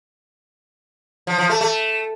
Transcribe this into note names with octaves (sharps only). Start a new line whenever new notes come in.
F3
F3
A3
A3